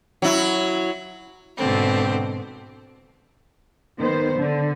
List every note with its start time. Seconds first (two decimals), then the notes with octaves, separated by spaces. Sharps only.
0.22 F#3 E4
1.56 G#2 B2 D3 C4
3.98 D#3 B3 C5
4.36 D3